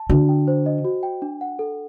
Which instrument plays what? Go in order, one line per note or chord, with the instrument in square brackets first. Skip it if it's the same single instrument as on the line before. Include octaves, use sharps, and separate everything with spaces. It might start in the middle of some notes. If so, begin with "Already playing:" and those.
Already playing: [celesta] A5
[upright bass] D3 [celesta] F#4
[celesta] G5
C5
D#5
F#4
G5
D4
F#5
A4